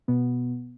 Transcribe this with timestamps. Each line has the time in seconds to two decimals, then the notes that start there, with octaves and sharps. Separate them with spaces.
0.08 B2 B3